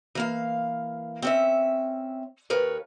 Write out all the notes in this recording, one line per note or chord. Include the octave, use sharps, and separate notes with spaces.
E3 A#3 F5
C4 C#4 E5
D#2 A#4 B4 C#5